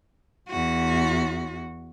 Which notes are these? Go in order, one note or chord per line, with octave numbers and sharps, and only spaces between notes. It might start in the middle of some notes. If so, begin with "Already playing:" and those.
E2 F#4